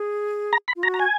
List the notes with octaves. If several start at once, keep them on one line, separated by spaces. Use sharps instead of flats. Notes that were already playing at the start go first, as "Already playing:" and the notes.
Already playing: G#4
A#5
B5
F4
F#4 A#5
A#5
G#5